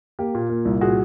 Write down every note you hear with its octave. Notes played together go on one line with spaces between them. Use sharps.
A#3 G4
A#2
A#3
C2
A#2 F#4 G#4